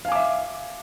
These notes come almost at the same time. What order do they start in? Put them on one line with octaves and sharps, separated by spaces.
F5 G#5 D6 E5